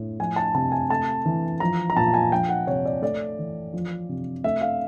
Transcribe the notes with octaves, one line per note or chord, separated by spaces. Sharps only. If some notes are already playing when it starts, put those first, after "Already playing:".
Already playing: A2
F3 G#5
A5
C3 A5
G#5
A3 A5
E3
F3 A#5
A#5
A#2 A5
G#5
F3 G5
F#5
C3 C#5
D5
A3 D5
E3
F3
C3
A3 E5
F5